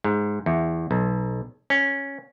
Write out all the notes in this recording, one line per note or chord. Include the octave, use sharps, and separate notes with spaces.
G#2
E2
B1
C#4